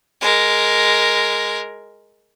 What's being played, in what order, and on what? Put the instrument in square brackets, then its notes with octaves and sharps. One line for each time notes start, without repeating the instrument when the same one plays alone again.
[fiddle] G#3 A#4